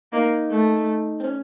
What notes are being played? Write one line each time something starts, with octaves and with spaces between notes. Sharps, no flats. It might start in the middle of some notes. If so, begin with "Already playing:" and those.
A#3 D#4
A3
C4
C#4